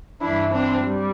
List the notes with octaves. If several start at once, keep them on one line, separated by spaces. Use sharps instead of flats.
G2 E3 D4 E4
C4 D4
G3